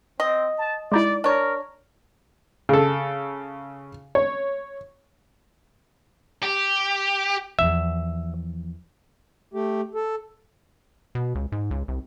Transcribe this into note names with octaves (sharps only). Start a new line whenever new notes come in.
C4 D#5
A5
G#3 D#4 E4 D5
D4 A#4 C#5
C#3 A4
C#5
G4
E2 F3 E5
A3 G4
A4
B2
C#2
G#2
C#2
C2